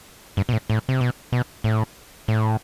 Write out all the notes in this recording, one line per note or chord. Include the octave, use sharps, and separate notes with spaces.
G2
B2
A2
A2
C3
B2
B2
A2
A2